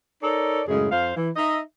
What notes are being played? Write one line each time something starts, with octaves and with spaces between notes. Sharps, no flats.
D#4 A4 A#4 C#5 D5
F#2 A2 C#3 G#3 G#4
F2 C5 F5
E3
D#4 D#5 E5